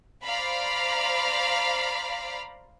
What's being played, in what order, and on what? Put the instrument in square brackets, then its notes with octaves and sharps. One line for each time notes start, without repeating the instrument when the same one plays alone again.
[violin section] C5 D5 F5 A#5 B5